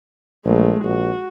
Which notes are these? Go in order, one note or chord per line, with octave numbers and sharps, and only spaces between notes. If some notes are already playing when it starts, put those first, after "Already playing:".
A#1 G#3 A3
A#1 F#4